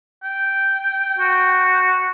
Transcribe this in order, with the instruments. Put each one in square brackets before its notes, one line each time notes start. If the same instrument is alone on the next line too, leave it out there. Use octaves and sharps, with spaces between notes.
[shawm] G5
[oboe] F#4